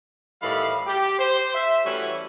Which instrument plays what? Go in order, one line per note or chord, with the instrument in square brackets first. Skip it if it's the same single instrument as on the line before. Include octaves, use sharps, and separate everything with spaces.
[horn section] A2 D#3 E3 G3 F5 B5
G4
C5
E5
E3 G3 A3 C#4 E4 F#4